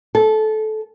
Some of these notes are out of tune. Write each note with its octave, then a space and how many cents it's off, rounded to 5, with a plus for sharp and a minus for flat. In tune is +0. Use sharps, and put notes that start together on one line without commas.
A4 -20